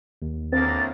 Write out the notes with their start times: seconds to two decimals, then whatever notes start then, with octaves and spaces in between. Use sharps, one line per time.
0.22 D#2
0.52 D2 A2 A#3 C4 A6